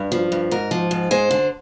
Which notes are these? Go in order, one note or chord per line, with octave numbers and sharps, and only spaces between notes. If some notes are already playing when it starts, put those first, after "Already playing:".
Already playing: G2
F3
G2
G#2 A#4
F3
G#2
G#3 C5
D3